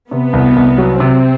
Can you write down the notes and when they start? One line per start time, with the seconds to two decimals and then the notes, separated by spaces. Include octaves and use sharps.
0.11 C3 B3
0.33 C2
0.56 C2
0.78 F#3
1.00 C3 C4